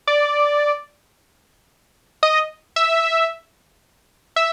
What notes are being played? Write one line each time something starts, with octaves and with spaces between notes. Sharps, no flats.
D5
D#5
E5
E5